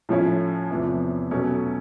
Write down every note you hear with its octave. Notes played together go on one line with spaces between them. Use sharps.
A2 F3 A3 C#4 E4
E2 C3 F3
B2 F#3 A3 C#4